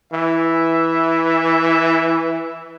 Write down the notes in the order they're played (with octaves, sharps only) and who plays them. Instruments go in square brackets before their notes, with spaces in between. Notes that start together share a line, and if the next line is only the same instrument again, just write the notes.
[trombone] E3 [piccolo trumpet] E5